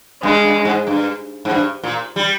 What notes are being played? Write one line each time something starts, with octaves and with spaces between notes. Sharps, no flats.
G2 G#3
G2
G#2
G2
G#2
G2
A#2
G3